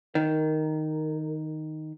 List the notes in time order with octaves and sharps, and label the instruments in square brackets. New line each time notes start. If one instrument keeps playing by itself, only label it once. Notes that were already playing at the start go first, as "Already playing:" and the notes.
[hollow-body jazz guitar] D#3 [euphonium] A#4